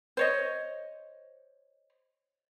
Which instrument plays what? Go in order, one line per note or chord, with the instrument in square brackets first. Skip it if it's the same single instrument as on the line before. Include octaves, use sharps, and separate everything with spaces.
[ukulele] C5 C#5 D#5